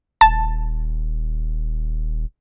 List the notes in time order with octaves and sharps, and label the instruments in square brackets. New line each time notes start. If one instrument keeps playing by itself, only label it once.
[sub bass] D#1 [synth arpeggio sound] A5